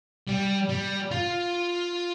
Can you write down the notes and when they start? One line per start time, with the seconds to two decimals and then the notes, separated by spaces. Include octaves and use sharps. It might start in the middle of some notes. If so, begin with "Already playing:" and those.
0.29 G3
0.70 G3
1.11 F4